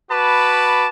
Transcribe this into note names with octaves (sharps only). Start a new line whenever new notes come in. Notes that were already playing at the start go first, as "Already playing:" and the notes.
F#4 B4 A5 B5 D6